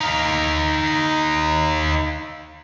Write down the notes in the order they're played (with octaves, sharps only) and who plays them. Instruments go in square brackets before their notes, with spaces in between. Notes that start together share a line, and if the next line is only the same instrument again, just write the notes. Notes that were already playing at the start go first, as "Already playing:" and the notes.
[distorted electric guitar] D#4 F5